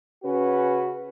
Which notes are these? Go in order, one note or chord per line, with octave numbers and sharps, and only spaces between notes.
C#3 C#4 F#4 B4